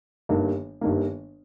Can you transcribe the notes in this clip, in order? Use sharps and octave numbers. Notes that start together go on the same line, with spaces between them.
G1 G2 D#3 A#3
G1 G2 D#3 A#3